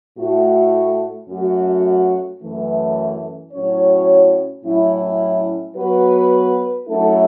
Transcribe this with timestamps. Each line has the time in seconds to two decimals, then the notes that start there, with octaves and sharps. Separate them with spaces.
0.18 A2 A3 F#4
1.29 F#2 F#3 A3 F#4
2.41 F#2 E3 A3
3.53 A2 F#3 C#4 F#4 C#5
4.64 A2 F#3 C#4 E4
5.75 F#3 B3 F#4 B4
6.87 F#3 A3 C#4 E4 A4